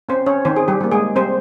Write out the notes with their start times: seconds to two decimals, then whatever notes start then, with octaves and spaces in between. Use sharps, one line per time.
0.09 C4 C#4 C5
0.26 C#4 C#5
0.45 D#3 C4 C5
0.56 G#4
0.68 G3 G4
0.81 G3 A#3
0.91 G#3 G#4
1.16 G3 C4 C5